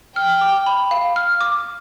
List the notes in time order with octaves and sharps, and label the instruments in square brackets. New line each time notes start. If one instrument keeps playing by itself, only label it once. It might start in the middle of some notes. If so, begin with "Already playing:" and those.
[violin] G5 [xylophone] F6
[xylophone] D6
B5
F5
F6
D6